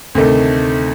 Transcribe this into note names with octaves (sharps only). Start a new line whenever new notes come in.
D2 C3 D#3 A3